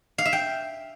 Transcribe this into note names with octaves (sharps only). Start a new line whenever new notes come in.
F5
E5
G5